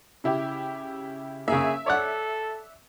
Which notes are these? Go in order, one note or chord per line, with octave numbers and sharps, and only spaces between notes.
C#3 E4 G4
C#3 A#3 G#4 E5
A4 C#5 D5 F#5